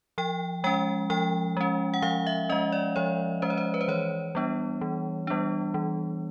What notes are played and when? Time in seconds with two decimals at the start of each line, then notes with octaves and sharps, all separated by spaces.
0.18 F3 G5
0.64 G#3 C#4 G5
1.10 F3 G5
1.57 G#3 C#4
1.94 F#5
2.02 F3 F5
2.27 E5
2.49 G#3 C#4 D#5
2.72 D5
2.96 F3 C#5
3.42 G#3 C#4 C5
3.50 C#5
3.58 C5
3.74 B4
3.81 C5
3.88 E3 C#5
4.35 G3 B3 D4
4.81 E3
5.27 G3 B3 D4
5.74 E3